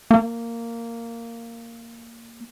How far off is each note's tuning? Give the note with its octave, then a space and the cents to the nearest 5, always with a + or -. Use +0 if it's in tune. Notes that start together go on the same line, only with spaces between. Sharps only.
A#3 -10